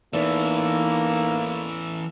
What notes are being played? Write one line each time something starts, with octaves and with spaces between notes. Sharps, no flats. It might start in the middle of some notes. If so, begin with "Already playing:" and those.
E2 E3 A3 A#3 D#4